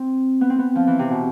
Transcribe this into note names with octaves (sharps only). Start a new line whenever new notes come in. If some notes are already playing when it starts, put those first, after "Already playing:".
Already playing: C4
B3
C4
B3
F3
E3
C3
B2